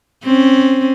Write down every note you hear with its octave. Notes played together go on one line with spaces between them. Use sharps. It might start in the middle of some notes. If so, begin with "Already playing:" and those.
C4 C#4